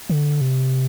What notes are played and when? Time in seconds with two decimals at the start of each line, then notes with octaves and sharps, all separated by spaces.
0.10 D3
0.41 C3